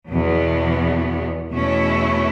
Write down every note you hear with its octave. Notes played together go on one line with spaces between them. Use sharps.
E2 B2 B3
E2 B2 A3 C#4 E4